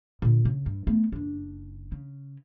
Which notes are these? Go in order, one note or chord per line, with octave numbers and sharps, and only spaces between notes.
A#2 D3
C#3
G2
A3 B3
F#1 D4
C#3